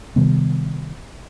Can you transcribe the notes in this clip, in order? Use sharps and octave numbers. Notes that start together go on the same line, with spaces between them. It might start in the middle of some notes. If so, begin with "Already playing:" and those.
C3 D#3 G3 B3